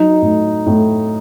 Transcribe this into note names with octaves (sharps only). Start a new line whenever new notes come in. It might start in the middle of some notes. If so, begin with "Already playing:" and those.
Already playing: F#3 D#4
A2
A2